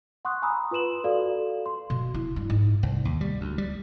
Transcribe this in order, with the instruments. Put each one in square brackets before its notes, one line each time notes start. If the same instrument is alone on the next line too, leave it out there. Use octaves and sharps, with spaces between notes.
[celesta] F#5 C6 C#6 D#6 F#6
G#5 A#5 B5 D#6 E6
F4 B4 C6 E7 F#7
F#4 A4 D5 F5
C6
[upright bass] B2
E4
G2
G#2
[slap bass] C2
D#2
G3
D2
G3